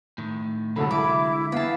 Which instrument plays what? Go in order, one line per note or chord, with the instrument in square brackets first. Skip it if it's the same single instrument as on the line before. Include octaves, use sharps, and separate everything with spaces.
[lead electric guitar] A2 D#3
[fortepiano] C2 F#3 B5 [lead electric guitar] D3 G#3 [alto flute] A4
[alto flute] E4 [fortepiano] B5 [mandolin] D6
[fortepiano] E3 B3 [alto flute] F5 [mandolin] A5 B5